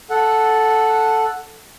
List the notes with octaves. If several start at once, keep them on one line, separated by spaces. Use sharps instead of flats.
A4 F#5